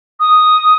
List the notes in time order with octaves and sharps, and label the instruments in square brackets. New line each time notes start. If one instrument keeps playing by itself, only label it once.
[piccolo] D#6